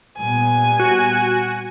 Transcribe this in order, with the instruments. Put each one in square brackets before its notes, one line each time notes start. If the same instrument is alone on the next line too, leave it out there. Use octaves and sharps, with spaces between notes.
[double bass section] A#2 G3 B3 [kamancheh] G#5
[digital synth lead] F#4